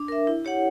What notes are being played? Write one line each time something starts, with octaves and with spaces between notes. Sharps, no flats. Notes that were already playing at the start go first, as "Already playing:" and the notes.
Already playing: D4
A#4 E5
E4
G4 C#5 F#5